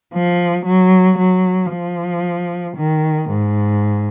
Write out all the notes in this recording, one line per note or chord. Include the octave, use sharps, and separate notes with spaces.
F3
F#3
F#3
F3
D#3
G#2